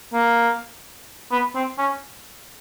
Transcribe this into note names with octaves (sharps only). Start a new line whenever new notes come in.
A#3
B3
C4
C#4